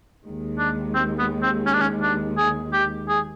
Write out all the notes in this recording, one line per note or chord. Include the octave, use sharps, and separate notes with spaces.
D#2 D#3 G#3
D4
C4
B3
C4
C#4
D4
C#4
D4
G#4
G4
G#4